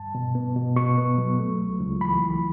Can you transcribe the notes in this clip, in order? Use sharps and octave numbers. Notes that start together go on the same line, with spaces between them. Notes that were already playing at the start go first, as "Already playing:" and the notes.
Already playing: G2 A5
B2
B3
B2
B2 C#6
B3
F#3
A3
C#2
C#2
E3 B5
E3